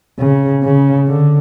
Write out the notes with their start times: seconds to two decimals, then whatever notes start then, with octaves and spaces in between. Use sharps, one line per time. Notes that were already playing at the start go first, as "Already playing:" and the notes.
0.19 C#3
0.64 C#3
1.08 D3